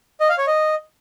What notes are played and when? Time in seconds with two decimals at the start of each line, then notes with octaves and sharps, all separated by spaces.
0.20 D#5
0.29 F5
0.38 C#5
0.47 D#5